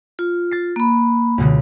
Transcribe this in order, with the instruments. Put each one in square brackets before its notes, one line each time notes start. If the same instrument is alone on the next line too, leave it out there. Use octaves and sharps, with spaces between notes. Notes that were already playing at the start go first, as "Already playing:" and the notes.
[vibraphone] F4
[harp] A6 C7
[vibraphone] A#3 B5
[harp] C#2 B2 D3